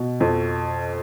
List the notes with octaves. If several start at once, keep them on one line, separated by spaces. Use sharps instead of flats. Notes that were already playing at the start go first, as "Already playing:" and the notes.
Already playing: B2
F2